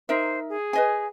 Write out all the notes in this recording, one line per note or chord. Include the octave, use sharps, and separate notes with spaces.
D#4 A#4 C5 E5
G#4
B4 D#5 G#5